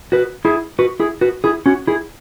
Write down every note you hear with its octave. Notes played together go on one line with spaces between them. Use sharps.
F#4 B4
E4 G#4
F#4 B4
E4 G#4
F#4 B4
E4 G#4
C#4 F#4
E4 G#4